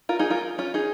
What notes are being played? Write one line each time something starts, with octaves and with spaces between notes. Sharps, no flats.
F4 A#4
D#4 G#4
F4 A#4
C#4 F4
D#4 G#4